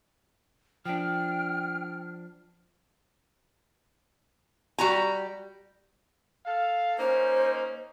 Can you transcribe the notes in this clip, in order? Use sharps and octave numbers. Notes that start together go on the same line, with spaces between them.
F3 D4 G5 F6
G3 F#4 A#5
A4 F5
A#3 C#4 D#4 C5